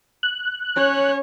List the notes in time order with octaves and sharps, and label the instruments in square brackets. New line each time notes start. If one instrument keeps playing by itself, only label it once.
[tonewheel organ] F#6
[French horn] C#4 [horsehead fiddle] C#5